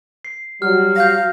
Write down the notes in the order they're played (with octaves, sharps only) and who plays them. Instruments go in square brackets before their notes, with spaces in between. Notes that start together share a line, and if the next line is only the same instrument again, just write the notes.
[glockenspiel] C7
[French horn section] F#3 G3 F#4 [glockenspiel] F6
[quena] F5 [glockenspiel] G6 A#6